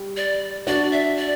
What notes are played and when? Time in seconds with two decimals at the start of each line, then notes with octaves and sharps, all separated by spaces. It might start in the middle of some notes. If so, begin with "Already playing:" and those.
Already playing: G3
0.17 D5
0.67 D4 F#4 D5
0.92 E5
1.17 D5